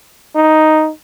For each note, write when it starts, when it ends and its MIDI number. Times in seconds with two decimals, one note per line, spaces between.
0.36 0.90 63